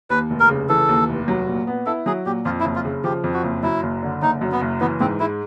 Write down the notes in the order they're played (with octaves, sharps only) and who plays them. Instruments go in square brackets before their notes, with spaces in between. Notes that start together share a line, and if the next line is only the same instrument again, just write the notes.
[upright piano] D#2 [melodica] B4
[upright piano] F1
[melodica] A#4
[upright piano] C#3
[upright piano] E3 [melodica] A4
[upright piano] D#2
F1
F#3
A#2
B3
[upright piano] E4 [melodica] A4
[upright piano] F#3 [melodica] G#4
[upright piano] A#2 [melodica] G4
[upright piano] F2 [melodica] F4
[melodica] E4
[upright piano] F#1
[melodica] F4
[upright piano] C#3
[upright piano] F3 [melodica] G4
[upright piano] F2
[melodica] F#4
[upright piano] F#1
[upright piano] F#2 [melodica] E4
[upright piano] F#1
D3
[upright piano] F#1 [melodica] D#4
[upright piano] F#2
[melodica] B3
[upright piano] F#1
[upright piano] E3 [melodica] B3
[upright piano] G#2 [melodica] C4
[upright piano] G#3 [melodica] E4